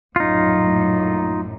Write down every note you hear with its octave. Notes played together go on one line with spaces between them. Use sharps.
A#1 F#2 A2 D#4 F4